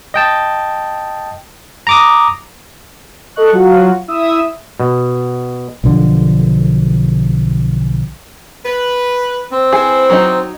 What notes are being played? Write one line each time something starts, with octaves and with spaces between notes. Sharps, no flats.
D#5 G5 A5
A#5 D6 D#6
A4 D#5 C#6 F#6
F#3 F4 F#4
E4 E5 D#6 E6
B2
B1 D3 F3
B4
C4
E4 G#4 B4 C5
F#3 D#4